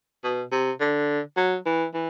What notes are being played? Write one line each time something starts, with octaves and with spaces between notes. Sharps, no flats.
B2
C3
D3
F#3
E3
E3